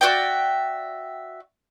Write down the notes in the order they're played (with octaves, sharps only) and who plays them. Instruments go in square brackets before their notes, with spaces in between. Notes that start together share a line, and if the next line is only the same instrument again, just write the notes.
[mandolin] F#4 D5 E5 G5